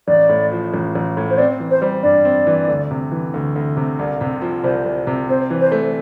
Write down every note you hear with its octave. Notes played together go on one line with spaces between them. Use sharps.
A1 D5
A2
F3
A1
A1
A2
C5
C4 D5
E3
C5
G3
G2 D5
C4
E3
D2
C3
E3
D2
D2
C3
C2
C3
F3
C2 C5
C2
C3
C4 C5
E3
C5
A3